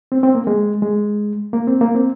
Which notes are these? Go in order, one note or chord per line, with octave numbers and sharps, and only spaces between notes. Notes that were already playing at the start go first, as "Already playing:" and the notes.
C4
C4
A#3
G#3
G#3
A#3
C4
A#3
C4